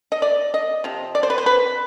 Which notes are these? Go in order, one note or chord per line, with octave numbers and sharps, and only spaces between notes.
D#5
D5
D#5
C3 F3
D5
C5
B4
C5
B4